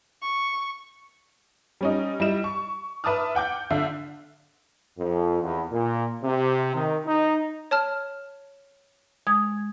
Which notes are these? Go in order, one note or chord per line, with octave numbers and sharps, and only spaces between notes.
C#6
G3 C#4 D#4
G3 E4 D#5 E7
C#6
B4 E5 A5 D6 D#6 F6
F#5 G5 D6 G6
D3 E5 F5
F2
E2
A#2
C3
D#3
D#4
C#5 A5 F6
G#3 D#6 G#6